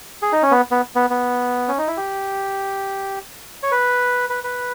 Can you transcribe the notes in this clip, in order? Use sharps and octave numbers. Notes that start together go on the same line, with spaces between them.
G#4
D#4
C#4
B3
B3
B3
B3
C#4
D#4
E4
G4
C#5
B4
B4
B4